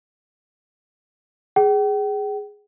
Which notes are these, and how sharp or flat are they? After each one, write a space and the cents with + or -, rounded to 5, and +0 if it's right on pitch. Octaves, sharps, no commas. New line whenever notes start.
G#4 +0 G5 -40